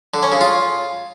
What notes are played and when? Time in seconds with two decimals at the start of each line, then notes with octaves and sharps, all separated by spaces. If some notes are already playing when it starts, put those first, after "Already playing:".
0.14 D3
0.23 C#4
0.32 C#3
0.41 F4